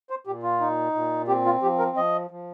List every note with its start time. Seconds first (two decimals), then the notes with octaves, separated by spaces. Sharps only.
0.10 C5
0.27 A#2 G4
0.43 F4
0.61 D#4
0.95 A#2
1.28 C4 G4
1.46 F4
1.62 F3 G4
1.79 A#4
1.97 F3 D#5
2.31 F3